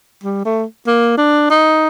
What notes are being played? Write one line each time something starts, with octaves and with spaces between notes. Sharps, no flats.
G3
A3
A#3
D4
D#4